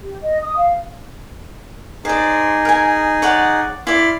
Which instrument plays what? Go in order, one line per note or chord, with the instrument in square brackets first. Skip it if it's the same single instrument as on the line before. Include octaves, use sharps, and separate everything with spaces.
[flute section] G4
D#5
D#6
F5
[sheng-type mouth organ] D#4 G#4 [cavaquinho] C5 D5
[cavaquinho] A#4 G#5
C#5 D5 F#5
[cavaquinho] E4 D5 [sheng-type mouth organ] C6 F6